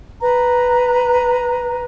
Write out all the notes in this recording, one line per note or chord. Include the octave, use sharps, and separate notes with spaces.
B4 A#5